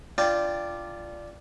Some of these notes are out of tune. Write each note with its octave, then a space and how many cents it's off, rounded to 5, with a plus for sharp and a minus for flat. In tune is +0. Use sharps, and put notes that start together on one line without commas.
D4 +0 F4 -15 G5 +0